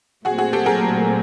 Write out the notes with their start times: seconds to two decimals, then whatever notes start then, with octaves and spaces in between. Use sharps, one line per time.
0.25 A#2 F#3 A3 C4 F#4 G#4
0.38 F#4 G#4
0.53 G4 A4
0.66 G#4 A#4